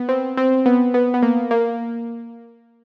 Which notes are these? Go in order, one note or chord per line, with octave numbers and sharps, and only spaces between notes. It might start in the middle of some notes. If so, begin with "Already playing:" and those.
Already playing: B3
C4
C4
B3
B3
B3
A#3
A#3